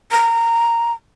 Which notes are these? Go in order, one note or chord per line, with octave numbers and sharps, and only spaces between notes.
A#5